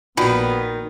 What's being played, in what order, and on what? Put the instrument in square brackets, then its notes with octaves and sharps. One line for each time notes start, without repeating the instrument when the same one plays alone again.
[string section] A#1 [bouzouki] D#3 [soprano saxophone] B3 [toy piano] F4 F#4 D5